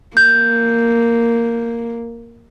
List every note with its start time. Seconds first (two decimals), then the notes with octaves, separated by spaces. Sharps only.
0.17 A#3 G6